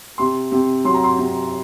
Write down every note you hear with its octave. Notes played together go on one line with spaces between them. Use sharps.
C3 C6
C3
F#3 C6
A#5
C6
C3